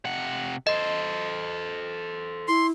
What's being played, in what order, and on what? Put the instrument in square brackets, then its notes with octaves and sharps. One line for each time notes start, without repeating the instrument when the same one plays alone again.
[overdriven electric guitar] C3 F#5
[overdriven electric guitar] A4 C5 [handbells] D#5
[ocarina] E4 [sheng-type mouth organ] C6